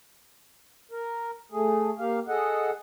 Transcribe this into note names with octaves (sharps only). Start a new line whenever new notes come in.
A#4
A3 G#4
A#3 G4 F5
G#4 A4 D#5 F#5